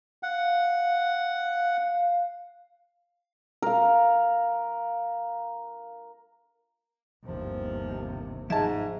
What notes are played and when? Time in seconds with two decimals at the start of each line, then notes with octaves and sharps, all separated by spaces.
0.23 F5 F#5
3.62 A#4 F5
7.26 G1 D#2 C3 F3
8.50 G#2 F3 G#4 D#5 E5 A5